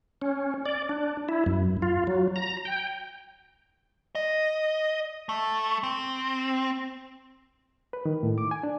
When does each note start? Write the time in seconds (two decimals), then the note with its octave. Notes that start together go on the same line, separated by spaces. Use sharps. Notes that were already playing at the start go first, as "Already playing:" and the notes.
0.22 C#4
0.66 D5
0.89 D4
1.29 E4
1.46 F#2
1.82 F4
2.07 F#3
2.36 A#5
2.65 G5
4.15 D#5
5.29 A3
5.83 C4
7.93 B4
8.05 D#3
8.23 A2
8.38 D6
8.51 G#5
8.63 D4